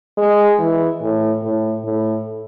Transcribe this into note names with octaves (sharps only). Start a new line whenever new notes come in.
G#3
E3
A2
A2
A2